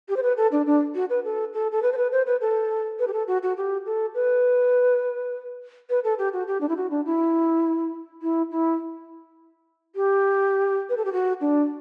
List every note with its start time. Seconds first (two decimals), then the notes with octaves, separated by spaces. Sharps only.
0.09 G4
0.17 C5
0.23 B4
0.37 A4
0.52 D4
0.67 D4
0.95 F#4
1.10 B4
1.24 A4
1.54 A4
1.72 A4
1.83 B4
1.93 C5
1.97 B4
2.12 C5
2.26 B4
2.41 A4
2.99 B4
3.08 G4
3.13 A4
3.28 F#4
3.43 F#4
3.57 G4
3.86 A4
4.15 B4
5.90 B4
6.04 A4
6.19 G4
6.33 F#4
6.48 G4
6.61 D4
6.69 E4
6.77 F#4
6.91 D4
7.06 E4
8.22 E4
8.51 E4
9.96 G4
10.89 B4
10.97 A4
11.05 G4
11.13 F#4
11.41 D4